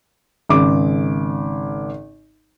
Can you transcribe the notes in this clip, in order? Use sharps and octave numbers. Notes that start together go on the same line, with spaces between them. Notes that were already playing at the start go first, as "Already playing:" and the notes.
G#1 C#3 D6